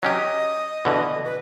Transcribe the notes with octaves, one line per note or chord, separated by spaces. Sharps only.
F#3 C#4 G4 D#5
B2 D3 E3
B4